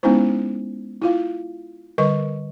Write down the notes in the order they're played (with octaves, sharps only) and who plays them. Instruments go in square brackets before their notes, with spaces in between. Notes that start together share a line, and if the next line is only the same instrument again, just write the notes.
[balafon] G#3 B3 C#4 D#4 E4 C5
E4 F4 F5
D3 G3 A#4 B4 D#5 C#6